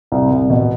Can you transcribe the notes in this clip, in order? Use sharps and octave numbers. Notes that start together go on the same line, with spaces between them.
C2
C2
B2